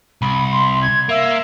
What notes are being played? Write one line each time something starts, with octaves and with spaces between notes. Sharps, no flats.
C2 B5
C6
G#6
A#3 E5